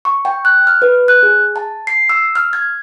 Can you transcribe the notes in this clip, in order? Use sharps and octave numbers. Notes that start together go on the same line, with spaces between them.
C#6
G5
F#6
F6
B4
F#6
G#4
A5
C7
E6
F6
G#6